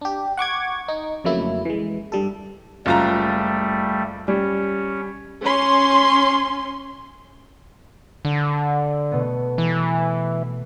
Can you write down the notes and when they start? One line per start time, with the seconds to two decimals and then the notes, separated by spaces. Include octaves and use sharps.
0.01 D4 G4
0.37 F#5 C#6 D6 G#6
0.88 D#4
1.24 F2 C#3 F#3 A3 A#3 E4
1.65 E3 G#3
2.12 G2 G3 A4
2.86 F#1 G3 A3 F4 A#5
4.28 G3 C#4
5.42 C#4 C6
8.25 D3
9.12 B2 A3 B3
9.58 E3